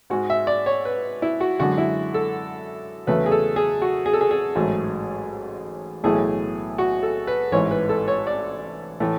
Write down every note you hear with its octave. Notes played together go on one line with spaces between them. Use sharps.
G#2 G#3 F#4
E5
D5
C#5
B4
E4
F#4
F#2 D3 G#3 F#4
E4
A4
E2 C#3 F#3 A3 B4
G#4
A4
G#4
F#4
G#4
A4
G#4
G#4
A1 G#2 F#3 A3
B1 A2 E3 A3 G#4
F#4
A4
B4
A1 G#2 E3 C#5
B4
A4
C#5
D5
A2 E3 A3